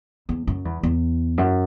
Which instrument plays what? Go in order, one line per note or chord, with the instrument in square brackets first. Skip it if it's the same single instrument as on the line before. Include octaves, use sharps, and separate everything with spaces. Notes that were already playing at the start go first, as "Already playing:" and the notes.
[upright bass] E2
F#2
E2
E2
F#2